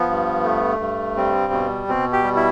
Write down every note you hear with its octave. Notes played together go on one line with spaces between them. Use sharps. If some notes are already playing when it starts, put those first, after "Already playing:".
Already playing: F3 B3
G2
A3
G2
G3 C4
B2
B2 C4
G4
G3
E4